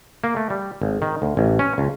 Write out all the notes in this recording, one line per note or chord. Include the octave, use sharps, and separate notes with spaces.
A#3
A3
G3
G#1
D#3
D2
A1
C#4
C#2